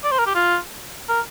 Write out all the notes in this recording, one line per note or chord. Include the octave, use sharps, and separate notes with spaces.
D5
C5
A#4
G4
F4
A#4